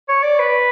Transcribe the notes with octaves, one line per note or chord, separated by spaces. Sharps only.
C#5
D5
B4